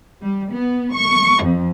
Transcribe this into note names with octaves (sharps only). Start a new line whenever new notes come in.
G3
B3
C#6
F2